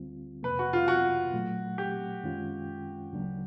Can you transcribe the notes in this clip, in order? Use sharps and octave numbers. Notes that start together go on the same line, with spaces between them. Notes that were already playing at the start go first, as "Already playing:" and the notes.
Already playing: D2 D3 G3 C4 F4
F2 C3 F3 A#3 B4
F#4
F4
F#4
A#2 F#3 A3
G4
F#2 D#3 G#3 C#4 F4
D2 C#3 F#3 A#3 D4